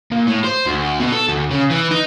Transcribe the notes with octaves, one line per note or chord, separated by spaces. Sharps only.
A#2
A2
C5
D2
B2
A4
D2
C#3
E3
D#4